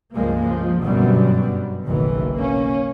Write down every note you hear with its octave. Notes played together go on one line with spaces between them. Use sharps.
C#2 G2 F3 G#3 A#3
F3
G1 F#2 B2 F#3 G3 B3
F#1 B1 D#3 E3
A#3 C#4